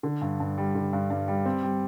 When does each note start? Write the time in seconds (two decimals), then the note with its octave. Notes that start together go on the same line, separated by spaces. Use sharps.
0.03 D3
0.21 G2
0.40 G2
0.58 G3
0.75 D3
0.93 G2
1.10 G2
1.28 G3
1.46 C4
1.63 G3